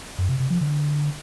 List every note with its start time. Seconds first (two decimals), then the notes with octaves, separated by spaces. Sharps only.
0.18 F#2
0.29 C3
0.40 C3
0.50 F3
0.61 D3